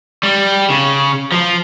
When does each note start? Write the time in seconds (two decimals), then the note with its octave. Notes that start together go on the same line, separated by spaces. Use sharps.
0.23 G3
0.70 C#3
1.32 F3